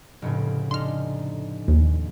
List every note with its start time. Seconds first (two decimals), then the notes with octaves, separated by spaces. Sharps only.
0.22 F1 A2 C#3
0.71 D4 D#4 C6 F6
1.68 D#2